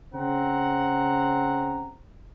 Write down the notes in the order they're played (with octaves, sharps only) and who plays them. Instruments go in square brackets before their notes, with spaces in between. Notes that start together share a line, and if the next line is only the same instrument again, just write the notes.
[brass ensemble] C#3 C4 F#5 A#5